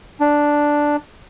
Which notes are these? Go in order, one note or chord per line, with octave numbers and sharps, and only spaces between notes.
D4